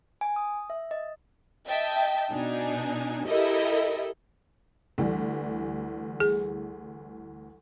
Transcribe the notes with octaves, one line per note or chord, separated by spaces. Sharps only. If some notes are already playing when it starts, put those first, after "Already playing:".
G#5
D#6
E5
D#5
D#5 E5 G5 A5
B2 D4 D#4 G#5
E4 G4 A4 A#4 D#5 E5
D2 E3 G3
G#4